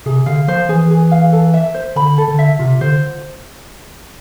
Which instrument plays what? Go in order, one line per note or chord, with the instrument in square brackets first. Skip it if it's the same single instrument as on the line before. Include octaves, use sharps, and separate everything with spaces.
[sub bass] C3 [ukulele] G#4
[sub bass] D3 [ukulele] F5
[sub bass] F3 [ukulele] C5
[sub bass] E3 [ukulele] G#4
[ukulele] G#4
F5
A4
E5
C5
[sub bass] D3 [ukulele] B5
[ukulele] A4
[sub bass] D3
[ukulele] E5
[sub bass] C3 [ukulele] F4
[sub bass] D3 [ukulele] C5